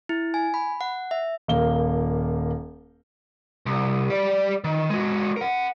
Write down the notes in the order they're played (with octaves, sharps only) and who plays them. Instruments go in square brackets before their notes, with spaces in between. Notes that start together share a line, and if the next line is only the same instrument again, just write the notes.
[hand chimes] E4
G#5
B5
F#5
E5
[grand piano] D#1 A#3 F5 G7
[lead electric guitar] C2
G3 D5
D#3
G#3 F#4
A#4 F#5